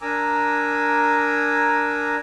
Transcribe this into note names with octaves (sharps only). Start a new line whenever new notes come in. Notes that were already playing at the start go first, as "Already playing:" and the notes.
D4 A#4 G#5 A#5 D6 E6